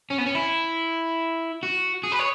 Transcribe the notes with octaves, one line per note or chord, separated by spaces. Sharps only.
C#4
B3
C#4
E4
F#4
G#4
B4
C#5